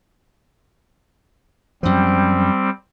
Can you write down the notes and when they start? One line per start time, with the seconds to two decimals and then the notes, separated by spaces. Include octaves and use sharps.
1.83 F#2 F3 G3 C4